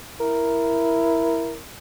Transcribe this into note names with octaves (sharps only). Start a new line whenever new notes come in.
E4 A#4